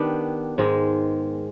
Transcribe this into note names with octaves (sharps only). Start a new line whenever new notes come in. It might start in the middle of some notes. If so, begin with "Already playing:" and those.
Already playing: D#3 B3 D4 G4
G#2 D#3 G#3